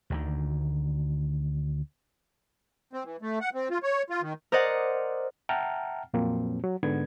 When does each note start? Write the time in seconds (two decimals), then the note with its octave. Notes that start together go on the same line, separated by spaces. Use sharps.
0.10 D2 D3 D#3
2.93 C4
3.05 E3
3.22 A3
3.41 F#5
3.54 C4
3.70 F4
3.83 C#5
4.10 F4
4.22 D#3
4.52 A#4 C5 D5 D#5 F#5
5.49 E5 F#5 G5 A5 A#5 F6
6.13 F2 A#2 F3 F#3 A#3 C4
6.64 F#3
6.83 G#2 D3 B3 G#6